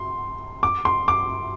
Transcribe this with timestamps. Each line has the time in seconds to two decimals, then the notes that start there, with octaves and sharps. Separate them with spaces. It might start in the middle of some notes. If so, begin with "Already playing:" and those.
Already playing: C6
0.63 D6
0.85 C6
1.08 D6